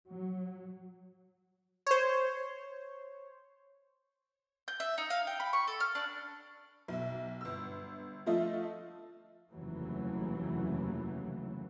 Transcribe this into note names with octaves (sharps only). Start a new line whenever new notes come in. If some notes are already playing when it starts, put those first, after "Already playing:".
F#3
C5 C#5
G6
E5
D#4
F5
G5
B5
C#6
A4
F6
D4
B1 E5
G1 E6
F3 A3 F4 D#5 E5
F1 D#2 C#3 E3 F#3 A3